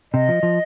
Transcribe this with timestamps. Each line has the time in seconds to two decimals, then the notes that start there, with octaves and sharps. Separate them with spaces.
0.13 C3 D#5
0.28 F3
0.43 F3